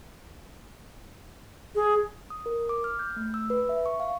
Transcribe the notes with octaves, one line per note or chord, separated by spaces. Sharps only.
G#4
D#6
A#4
D6
F6
G6
A3
E6
B4
E5
C#6
F5